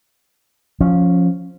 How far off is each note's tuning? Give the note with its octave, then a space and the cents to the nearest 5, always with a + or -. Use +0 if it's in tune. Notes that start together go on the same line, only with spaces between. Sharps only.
F3 +15 C#4 +0